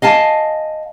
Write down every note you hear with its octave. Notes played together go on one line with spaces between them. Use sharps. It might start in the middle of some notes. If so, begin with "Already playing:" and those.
D#5 F5 G#5 A5